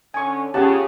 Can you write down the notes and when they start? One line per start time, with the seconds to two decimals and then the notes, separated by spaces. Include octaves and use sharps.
0.14 D3 C#4 G#5 C#6
0.54 C#3 B3 C#4 F4 G4 F#5 A5